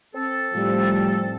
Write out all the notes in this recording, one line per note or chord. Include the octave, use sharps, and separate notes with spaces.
C4 A4
A2 F3 G3